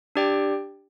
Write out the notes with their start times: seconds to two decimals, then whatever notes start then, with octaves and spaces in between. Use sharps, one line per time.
0.16 D4 G4 D5 G5